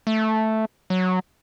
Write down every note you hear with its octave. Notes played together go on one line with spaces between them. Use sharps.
A3
F#3